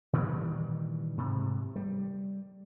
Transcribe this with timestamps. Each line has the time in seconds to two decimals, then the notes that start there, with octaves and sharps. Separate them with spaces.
0.13 A#2 D#3 E3 G3
1.17 G#2 C3
1.76 G3